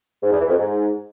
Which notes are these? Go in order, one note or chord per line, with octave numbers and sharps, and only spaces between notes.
G#2
E2
E3
F2
G#2